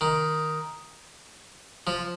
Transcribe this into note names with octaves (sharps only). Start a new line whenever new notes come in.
D#3
F3